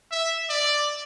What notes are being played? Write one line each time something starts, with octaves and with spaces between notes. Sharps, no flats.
E5
D5